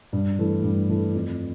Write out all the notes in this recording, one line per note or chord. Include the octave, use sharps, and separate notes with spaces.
G2
E3 A3
G2
E3 A3
F2